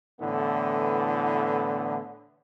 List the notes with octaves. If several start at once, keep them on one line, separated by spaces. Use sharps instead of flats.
A2 D3 E3 B3